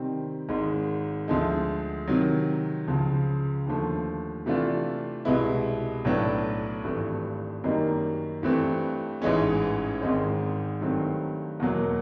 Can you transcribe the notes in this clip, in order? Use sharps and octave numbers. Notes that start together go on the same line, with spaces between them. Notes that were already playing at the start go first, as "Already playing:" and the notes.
Already playing: C3 D#3 G3 C4
G#1 G#2 D#3 G#3
D2 D3 F3 G#3
C3 D#3 F#3
C#2 C#3 F3
D#2 D3 F3 A3
C3 E3 A3 D4 F4
C2 B2 G#3 B3 E4
B1 A2 F#3 B3 D4
G#1 G2 E3 A3
F#2 D#3 G3 A#3 D#4
G2 E3 A3 C4
A1 G#2 E3 G#3 C#4
G#1 G#2 D#3 G#3 C4
G2 D#3 F#3 A3 C4
E2 B2 F#3 A#3